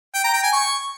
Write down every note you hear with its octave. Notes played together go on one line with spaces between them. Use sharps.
G5
A#5
G5
G#5
C#6